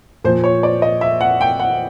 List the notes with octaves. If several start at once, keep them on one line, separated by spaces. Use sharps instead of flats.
A#2 F3 C5
C#5
D5
D#5
E5
F#5
G5
F#5